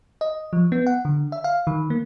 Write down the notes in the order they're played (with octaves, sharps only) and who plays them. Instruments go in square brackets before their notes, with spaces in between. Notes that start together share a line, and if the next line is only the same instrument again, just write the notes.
[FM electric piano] D#5
F3
B3
F#5
D3
E5
F5
D#3
A#3